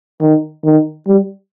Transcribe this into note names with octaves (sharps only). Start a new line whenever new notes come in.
D#3
D#3
G3